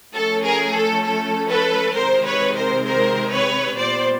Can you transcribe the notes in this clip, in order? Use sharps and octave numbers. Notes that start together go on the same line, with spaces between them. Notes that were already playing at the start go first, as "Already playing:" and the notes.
F3 A3 C#4 A4
G#4 A#4
A4
A4
A4 B4
C3 D#3 G#3 C4 A#4 C5
B4 C#5
A#4 C5
A#4 C5
B4 C#5
A#2 G3 B3 C5 D5